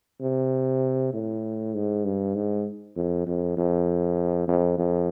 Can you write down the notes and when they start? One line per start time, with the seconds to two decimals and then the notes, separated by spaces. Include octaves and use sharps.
0.22 C3
1.13 A2
1.74 G#2
2.05 G2
2.35 G#2
2.96 F2
3.27 F2
3.57 F2
4.48 F2
4.78 F2